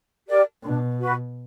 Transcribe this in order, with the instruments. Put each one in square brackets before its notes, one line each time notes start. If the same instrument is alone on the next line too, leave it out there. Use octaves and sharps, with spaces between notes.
[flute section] G4 A#4 D5
[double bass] B2 [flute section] D4
[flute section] F#4 B4